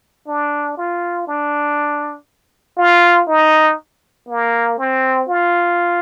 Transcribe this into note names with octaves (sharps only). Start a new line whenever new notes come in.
D4
F4
D4
F4
D#4
A#3
C4
F4